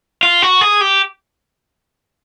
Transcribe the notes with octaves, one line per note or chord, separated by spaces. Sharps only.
F4
F#4
G#4
G4